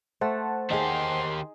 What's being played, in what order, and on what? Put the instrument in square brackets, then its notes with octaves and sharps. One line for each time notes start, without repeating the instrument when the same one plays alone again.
[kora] A3 [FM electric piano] C5 F#5 A5
[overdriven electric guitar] D#3 G4 [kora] D#4 G#4 [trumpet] C6